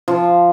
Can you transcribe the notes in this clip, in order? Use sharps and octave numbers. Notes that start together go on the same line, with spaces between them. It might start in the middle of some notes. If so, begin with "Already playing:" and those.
F3